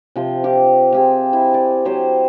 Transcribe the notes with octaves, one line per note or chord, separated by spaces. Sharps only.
C3 F3 C6
F4 G4 D6
C4 F4 G4 G#4
E4
D5
F#3 G4 C5